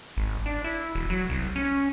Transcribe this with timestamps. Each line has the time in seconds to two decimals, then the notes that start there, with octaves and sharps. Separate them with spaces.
0.17 G#1
0.46 D4
0.64 E4
0.95 E1
1.10 F#3
1.30 C2
1.56 C#4